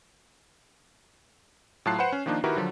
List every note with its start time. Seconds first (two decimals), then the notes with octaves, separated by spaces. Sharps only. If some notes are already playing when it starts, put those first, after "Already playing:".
1.86 A2 F#3 F4 A5 F#6 C7
1.98 B4 C5 F#5 E7
2.12 C#4
2.26 D#3 F3 A#3 D4 D#4
2.44 D#3 E4 F#4 G4 A#4 B4
2.56 D3 F3 F#3